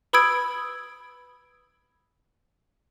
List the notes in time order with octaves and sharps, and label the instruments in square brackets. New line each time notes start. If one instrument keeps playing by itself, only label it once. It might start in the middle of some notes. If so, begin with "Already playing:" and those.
[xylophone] B4 B5 D#6 E6 G#6 D7